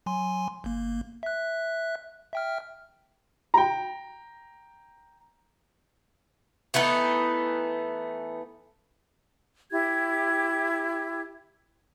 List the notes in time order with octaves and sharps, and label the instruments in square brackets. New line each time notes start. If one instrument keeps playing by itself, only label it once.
[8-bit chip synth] F#3 G#5 C6
G1 A#3
E5 F#6
E5 G5 F6
[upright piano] G5 A#5
[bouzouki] E3 A3 B3 D#4
[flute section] E4 G4 G#6